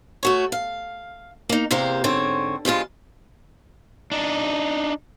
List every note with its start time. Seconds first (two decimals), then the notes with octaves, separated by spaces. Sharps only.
0.23 A3 F#4 C#5
0.52 F5
1.49 A#3 D#4
1.71 E2 C3 A#3 G4 C5 F5
2.04 G#2 D3 C4 C#5
2.65 G2 F3 G#3 F4
4.11 D4 D#4